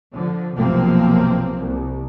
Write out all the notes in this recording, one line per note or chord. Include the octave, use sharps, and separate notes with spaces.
D3 F3
B1 F#2 C3 F3 A#3 C4
C2